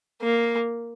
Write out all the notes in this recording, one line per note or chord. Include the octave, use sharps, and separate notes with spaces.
A#3